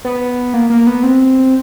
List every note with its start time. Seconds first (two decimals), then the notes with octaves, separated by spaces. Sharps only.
0.05 B3
0.54 A#3
0.70 A#3
0.87 B3
1.03 C4